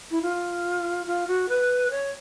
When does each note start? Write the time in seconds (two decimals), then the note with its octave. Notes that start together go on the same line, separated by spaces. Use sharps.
0.11 E4
0.22 F4
1.07 F4
1.28 F#4
1.49 B4
1.91 C#5